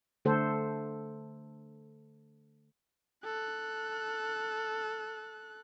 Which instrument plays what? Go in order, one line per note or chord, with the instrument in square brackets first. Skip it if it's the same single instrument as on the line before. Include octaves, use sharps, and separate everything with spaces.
[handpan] D3 A3 A4 C5
[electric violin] A4 F#6